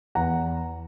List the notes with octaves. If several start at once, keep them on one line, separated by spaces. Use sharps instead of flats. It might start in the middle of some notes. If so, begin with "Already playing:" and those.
E2 F#5 A#5